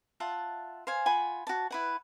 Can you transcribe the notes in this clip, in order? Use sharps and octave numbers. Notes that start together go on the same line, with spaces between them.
F4 E5 F#5 A5
C5 F5 G#5
F4 F#5 G#5 B5
F#4 A5
E4 B4 F#5